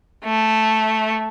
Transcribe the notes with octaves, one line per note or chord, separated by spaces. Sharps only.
A3